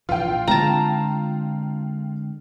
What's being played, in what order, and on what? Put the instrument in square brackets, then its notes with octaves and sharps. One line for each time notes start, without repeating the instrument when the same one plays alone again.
[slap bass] A#1 E3 [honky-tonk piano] F4 G5
[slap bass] D3 G#3 C4 [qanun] A5 A#5